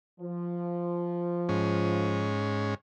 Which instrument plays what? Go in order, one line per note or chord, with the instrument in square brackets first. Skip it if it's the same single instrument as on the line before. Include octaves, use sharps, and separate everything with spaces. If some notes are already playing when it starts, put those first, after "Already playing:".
[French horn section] F3
[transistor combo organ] G#2 C#4